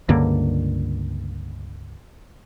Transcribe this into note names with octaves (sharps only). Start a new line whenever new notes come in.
C#2 G2 D3 A#3